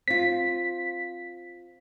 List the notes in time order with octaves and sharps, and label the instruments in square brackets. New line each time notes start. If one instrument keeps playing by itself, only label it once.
[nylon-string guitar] C4 F4 [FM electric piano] B6